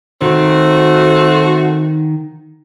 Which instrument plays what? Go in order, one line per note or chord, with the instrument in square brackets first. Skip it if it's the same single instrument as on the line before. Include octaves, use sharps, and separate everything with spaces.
[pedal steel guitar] D#3 [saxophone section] A3 C4 F#4